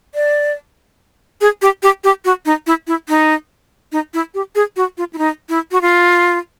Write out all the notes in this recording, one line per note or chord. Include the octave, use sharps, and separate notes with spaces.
D5
G#4
G4
G4
G4
F#4
D#4
E4
E4
D#4
D#4
E4
G4
G#4
F#4
F4
E4
D#4
E4
F#4
F4